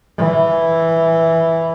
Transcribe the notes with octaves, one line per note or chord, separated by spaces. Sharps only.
E3